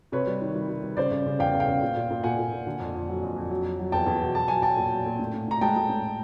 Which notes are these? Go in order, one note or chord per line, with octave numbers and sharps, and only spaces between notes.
C3 B4 C#5
G3
D#3
G3
G3
G3
C#3 C5 D5
C#3
C#3
E2 F5 G5
E2
F5 G5
C#3
A#2
A#2
A#2
A#2 F#5 G#5
A#2
A#2
D3
F2
F2
F#3
F2
F2
F#3
F#3
F#3
E2 G5 A5
E2
B2
F#3 A5
F#3 G#5
F#3 G5 A5
A#2
F#3
A#2
A2
A2
A2 A#5
G#3 G5 A5
G#3
A2